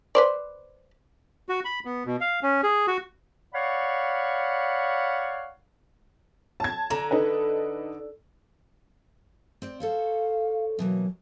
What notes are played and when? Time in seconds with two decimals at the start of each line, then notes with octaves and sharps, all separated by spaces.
0.15 B4 C5 D5
1.49 F#4
1.65 B5
1.85 B3
2.06 B2
2.21 F5
2.43 C#4
2.63 G#4
2.87 F#4
3.54 C#5 D5 F5 F#5 B5 C#6
6.60 A5 G#6
6.90 D3 A#5
7.11 D#4 A4 B4
9.62 C4 C5 D5
9.80 A4 C5 C#5 F5
10.79 B2 E3 F#3 A#3